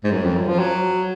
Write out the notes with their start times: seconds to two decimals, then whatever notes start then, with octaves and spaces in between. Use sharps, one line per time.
0.04 G#2
0.12 F#2
0.24 F2
0.36 F#2
0.48 F3
0.59 F#3